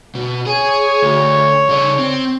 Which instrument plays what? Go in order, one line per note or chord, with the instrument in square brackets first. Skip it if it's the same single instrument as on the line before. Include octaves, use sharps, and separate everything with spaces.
[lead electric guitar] B2
[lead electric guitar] G#4 [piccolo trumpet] C#5
[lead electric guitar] D2
C#3 D5
C4